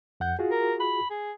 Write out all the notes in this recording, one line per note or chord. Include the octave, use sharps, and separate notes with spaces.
F2 F#5 G6
F4 F#4 G#4
A#4
B5
G#4